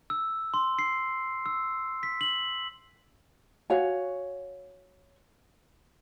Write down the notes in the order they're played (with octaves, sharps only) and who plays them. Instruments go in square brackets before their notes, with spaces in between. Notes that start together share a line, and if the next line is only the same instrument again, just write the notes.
[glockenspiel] E6
C6
C7
E6
B6
F#7
[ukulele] F#4 C#5 F5 G#5